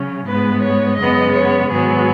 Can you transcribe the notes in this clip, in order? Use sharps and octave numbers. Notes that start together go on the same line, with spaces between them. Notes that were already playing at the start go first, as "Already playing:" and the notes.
Already playing: C#3 F#3 C#4
G#2 G#3 B3 B4
C#5
F#2 C#3 G#3 B3 D#5
C#5
G#2 D#3 F#3 B3 G#4